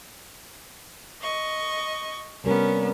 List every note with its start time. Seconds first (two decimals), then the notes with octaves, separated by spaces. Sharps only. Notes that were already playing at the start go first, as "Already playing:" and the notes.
1.20 D#5 C#6
2.44 C3 G3 B3 C#4 A#4